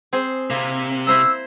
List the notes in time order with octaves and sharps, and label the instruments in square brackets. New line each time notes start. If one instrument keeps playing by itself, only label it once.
[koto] C4 G#4 C5
[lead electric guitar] C3 [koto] A#3 E4
[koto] E4 C5 A#5 [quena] E6